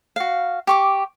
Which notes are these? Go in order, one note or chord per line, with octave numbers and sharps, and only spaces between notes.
F#4 F5
G4 C#6 D6